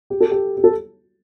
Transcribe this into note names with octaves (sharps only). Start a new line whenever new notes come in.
G4
A4
G4
G4
A4